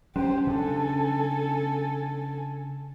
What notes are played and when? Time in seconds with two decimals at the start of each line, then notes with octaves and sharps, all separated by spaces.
0.16 F#3 C#4 G4 C5
0.47 C#3 D4 A4 G#5